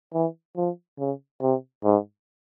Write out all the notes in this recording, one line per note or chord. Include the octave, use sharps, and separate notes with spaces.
E3
F3
C#3
C3
G#2